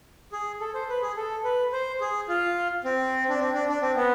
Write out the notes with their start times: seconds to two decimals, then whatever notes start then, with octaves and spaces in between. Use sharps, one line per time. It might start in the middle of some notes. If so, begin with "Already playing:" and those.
0.32 G#4
0.61 A4
0.74 C5
0.89 B4
1.02 G#4
1.16 A4
1.44 B4
1.72 C5
2.01 G#4
2.28 F4
2.84 C4
3.29 D4
3.40 C4
3.54 D4
3.69 D4
3.82 C4
3.96 B3